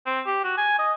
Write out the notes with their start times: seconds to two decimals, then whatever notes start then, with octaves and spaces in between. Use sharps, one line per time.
0.06 C4
0.27 G4
0.44 F#4
0.58 G#5
0.79 D#5